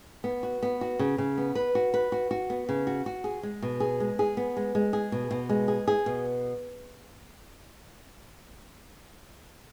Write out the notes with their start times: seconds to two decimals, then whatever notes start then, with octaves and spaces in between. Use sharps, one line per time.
0.24 B3
0.43 F#4
0.63 B3
0.81 F#4
0.99 C#3
1.18 C#3
1.38 B3
1.55 B4
1.75 F#4
1.94 B4
2.12 F#4
2.31 F#4
2.50 B3
2.69 C#3
2.87 F#4
3.06 F#4
3.24 G#4
3.43 G#3
3.62 B2
3.80 G#4
4.00 G#3
4.19 G#4
4.37 B3
4.57 G#3
4.75 G#3
4.93 G#4
5.12 B2
5.31 B2
5.49 G#3
5.68 G#4
5.88 G#4
6.06 B2